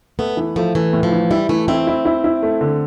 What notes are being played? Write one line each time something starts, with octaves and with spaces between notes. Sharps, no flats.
A3 B3
E3
F3 A3
E3 A3
A2
F3
E3
G3 E4
E3 A3
C4 E4
E4
E4
E4
A3
D3